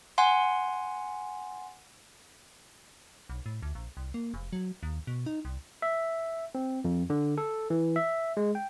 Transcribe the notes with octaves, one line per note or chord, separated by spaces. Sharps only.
F#5 G#5 C6
B1
A2
D2
A#1
C2
A#3
F1
F#3
D#2
B2
D#4
C2
E5
C4
F2
D3
A4
E3
E5
G#3
G5